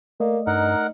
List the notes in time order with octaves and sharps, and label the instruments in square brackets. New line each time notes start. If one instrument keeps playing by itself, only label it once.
[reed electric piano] A3 D5 D#5 [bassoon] A#3
[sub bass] G2 [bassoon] D#4 [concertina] A#4 F#5